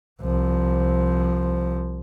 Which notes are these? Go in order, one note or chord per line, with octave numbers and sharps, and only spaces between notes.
C2 F3